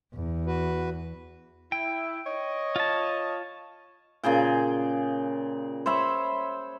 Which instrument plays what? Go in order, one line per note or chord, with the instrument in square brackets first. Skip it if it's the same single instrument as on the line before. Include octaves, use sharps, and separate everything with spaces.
[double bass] E2
[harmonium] F#4 B4
[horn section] E4 [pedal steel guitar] G5
[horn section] C#5 D#5
[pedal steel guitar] F4 A5
[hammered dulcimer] A#2 C#3 G#4 G5
C5 C#5 E5 B5